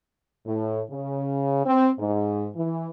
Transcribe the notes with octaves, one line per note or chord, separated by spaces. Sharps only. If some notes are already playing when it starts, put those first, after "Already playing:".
A2
C#3
C4
G#2
E3